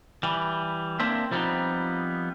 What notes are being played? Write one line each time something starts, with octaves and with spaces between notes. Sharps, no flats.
E3 G3
A#3 C4 D4 C5 E5
F3 G3 A3 B3 C4 D#4